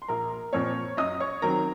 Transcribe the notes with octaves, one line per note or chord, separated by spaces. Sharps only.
C6
A#1 A#4 A#5
A#2 F3 C4 C#5 C#6
F#2 D#5 D#6
C#5 C#6
D#3 F#3 C4 A#4 A#5